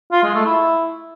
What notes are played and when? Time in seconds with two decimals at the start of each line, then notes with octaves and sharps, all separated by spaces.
0.12 F4
0.23 G#3
0.35 A3
0.46 E4